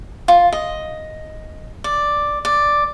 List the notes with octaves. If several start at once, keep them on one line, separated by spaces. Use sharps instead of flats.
F4
D#5
D5
D5